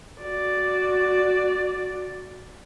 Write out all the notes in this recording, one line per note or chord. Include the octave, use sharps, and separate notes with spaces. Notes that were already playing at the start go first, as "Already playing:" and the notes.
F#4 D5